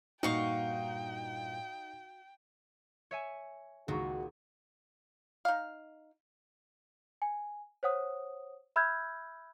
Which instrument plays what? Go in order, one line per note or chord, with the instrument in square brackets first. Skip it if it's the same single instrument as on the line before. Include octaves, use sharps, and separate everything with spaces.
[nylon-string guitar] G2 A#2 [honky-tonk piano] D#4 C#7 [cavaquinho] F#4 F5 C#6 [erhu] G5
[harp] C#5 E5 G#5
[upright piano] C#2 C#6 [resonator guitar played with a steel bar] A#2 D#3 [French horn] F#4
[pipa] D#4 F5
[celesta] G#5
C5 C#5 F#5 D#6
E5 B5 E6 F6 G6 G#6